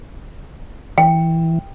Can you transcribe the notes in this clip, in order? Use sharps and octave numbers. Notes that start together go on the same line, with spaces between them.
E3 G5